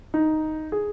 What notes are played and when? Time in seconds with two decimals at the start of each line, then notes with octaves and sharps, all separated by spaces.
0.14 D#4
0.72 G#4